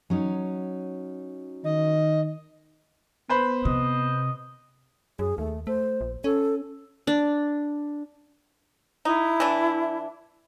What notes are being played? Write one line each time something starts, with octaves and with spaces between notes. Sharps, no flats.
F#3 C#4 D#4
D#3 D#5
B3 B4 C5 B5
C3 D#5
F#2 G#4
D#2 A3
A3 C5
A#1
C#4 A4
D4
D#4 E4
E3 D4